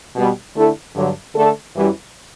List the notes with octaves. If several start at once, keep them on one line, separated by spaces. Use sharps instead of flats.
B2 G3 B3
D3 A3 E4 A4
G2 D3 F#3
D3 A3 D4 A4
F#2 E3 G3